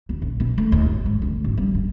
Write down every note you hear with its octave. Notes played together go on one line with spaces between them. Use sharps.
D#2
A#1
B2
A3
D#2
G#1
G#2
D2
G#1
G3
G2